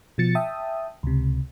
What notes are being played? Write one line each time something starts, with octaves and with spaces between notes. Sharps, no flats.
B2 F3 A6 C#7
E5 G5 A5 D#6
C#2 C3